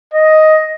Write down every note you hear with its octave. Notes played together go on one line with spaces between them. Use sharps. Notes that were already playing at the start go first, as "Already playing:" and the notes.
D#5